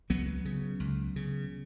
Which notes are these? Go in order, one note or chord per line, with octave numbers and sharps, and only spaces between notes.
C#2 F#3 B3
C#3
C#2
C#3